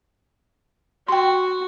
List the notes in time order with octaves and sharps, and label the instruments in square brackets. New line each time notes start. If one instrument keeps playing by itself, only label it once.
[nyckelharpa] F#4 [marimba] G5 C6